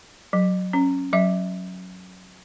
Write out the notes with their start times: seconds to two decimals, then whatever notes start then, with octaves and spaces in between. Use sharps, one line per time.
0.33 F#3
0.73 C#4
1.13 F#3 E5